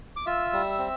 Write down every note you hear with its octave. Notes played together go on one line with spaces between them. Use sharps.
D6
F4 E5 E6
G3
C4